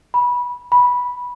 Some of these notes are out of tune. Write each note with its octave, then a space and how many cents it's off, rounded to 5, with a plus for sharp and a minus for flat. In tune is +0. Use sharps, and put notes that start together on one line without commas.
B5 -20
B5 -10